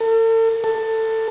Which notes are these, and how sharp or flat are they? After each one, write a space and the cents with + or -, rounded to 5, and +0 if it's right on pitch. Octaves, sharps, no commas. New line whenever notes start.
A4 +40
A4 +15